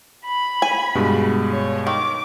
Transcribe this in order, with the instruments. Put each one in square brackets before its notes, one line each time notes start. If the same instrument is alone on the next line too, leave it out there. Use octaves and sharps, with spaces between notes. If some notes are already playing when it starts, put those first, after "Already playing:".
[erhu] B5
[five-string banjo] G#5
[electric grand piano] G2 B2 G#3
[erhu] C#5
[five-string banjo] D#3 [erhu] D6